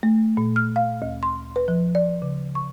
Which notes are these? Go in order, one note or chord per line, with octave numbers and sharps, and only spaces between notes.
A3
A#2
F6
F5
D2
C6
B4
F3
D5
C#3
C#6